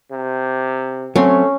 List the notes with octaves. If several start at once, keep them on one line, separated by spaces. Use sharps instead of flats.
C3
F#3 A3 C4 C#4